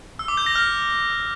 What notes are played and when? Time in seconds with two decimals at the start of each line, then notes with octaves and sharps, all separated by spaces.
0.19 E6
0.28 D6
0.37 G6
0.46 A#6
0.55 F6